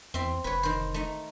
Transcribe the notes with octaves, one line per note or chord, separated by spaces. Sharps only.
E2 C4 E5 C6
F1 B4 C#5
D#3 C5
A3 D#4